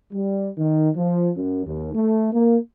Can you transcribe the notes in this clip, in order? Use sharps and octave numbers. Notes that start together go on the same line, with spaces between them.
G3
D#3
F3
F#2
D#2
A3
A#3